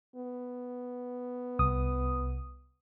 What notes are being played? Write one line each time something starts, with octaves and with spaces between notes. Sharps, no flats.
B3
C2 D#6